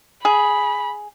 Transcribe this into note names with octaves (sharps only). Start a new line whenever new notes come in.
G#4 B5